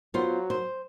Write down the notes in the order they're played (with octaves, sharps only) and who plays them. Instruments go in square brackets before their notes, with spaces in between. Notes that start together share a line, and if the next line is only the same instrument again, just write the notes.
[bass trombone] F#3 [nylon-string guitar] B3 F4 C5
[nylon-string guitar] C5